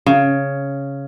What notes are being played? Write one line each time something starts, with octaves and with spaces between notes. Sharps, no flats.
C#3